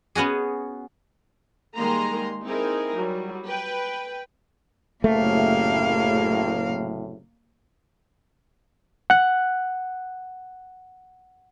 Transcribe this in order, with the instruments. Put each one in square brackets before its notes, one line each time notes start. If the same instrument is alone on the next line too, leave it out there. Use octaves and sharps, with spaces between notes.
[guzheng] B3 C#4 F#4 G#4
[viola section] D#3 G3 G#3 A#3 A#5 C6
C4 D#4 E4 G#4 A#4
F#3 G3
B4 G5
[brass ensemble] F#1 A2 C3 [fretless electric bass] A3 [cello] A#3 F5
[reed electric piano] F#5 F#6